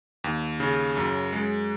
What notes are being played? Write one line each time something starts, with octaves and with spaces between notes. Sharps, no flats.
D#2
C#3
F#2
G#3